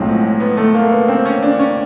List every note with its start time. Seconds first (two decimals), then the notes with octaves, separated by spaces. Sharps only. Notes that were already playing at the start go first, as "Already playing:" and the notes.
Already playing: B1 A2 F3 G#3 C4
0.40 B3
0.57 A3
0.74 A#3
0.91 B3
1.08 C4
1.25 C#4
1.43 D4
1.59 C#4